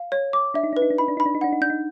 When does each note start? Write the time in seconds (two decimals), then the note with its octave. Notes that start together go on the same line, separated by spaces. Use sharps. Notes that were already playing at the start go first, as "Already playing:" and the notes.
Already playing: F5
0.12 C#5
0.33 D6
0.54 D4 E5
0.64 D#4
0.73 D4 B4
0.82 D#4
0.90 D4
0.98 D#4 B5
1.08 D4
1.17 D#4 B5
1.26 D4
1.35 D#4
1.41 D4 F#5
1.52 D#4
1.61 D4 G6
1.70 D#4